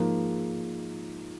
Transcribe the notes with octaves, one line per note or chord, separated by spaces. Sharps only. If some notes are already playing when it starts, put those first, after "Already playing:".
Already playing: G#2 F3 A#3